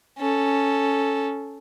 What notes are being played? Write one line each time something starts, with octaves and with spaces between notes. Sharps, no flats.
C#4 A4